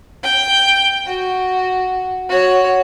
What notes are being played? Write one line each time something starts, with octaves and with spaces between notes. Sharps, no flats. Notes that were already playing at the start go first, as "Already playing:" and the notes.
G5
F#4
F#4 C#5